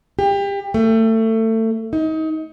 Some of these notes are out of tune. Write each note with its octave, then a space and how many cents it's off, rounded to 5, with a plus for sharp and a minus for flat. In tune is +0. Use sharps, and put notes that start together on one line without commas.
G4 +30
A3 +25
D#4 +30